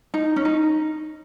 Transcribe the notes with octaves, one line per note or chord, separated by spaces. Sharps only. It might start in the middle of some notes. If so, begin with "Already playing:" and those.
D#4
C#4
D#4